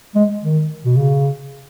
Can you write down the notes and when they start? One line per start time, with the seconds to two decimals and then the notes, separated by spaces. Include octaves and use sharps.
0.15 G#3
0.43 D#3
0.85 B2
0.96 C#3